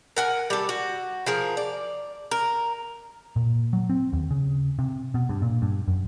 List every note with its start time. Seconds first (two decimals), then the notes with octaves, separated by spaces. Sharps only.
0.17 A#4 F#5 G#5
0.50 G3 A4
0.69 F#4
1.26 F3 G#4 A#4
1.57 D5
2.31 A#4
3.36 A#2
3.73 F#3
3.90 C4
4.13 D#2
4.31 C#3
4.79 C3
5.14 B2
5.29 G2
5.42 A#2
5.62 G2
5.88 F#2